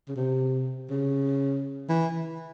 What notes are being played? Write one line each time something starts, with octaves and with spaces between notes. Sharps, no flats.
C#3
C3
C#3
E3